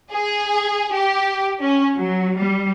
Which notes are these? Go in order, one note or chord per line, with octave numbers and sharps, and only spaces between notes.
G#4
G4
C#4
F#3
G3